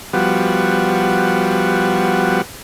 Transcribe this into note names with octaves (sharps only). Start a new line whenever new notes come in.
F3 G3 B3 F#4